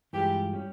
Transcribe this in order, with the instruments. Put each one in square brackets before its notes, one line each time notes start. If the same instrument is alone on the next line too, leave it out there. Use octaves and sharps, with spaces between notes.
[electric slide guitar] G2 E3 G#3 F4 [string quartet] G4
[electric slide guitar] G3 C#4 G4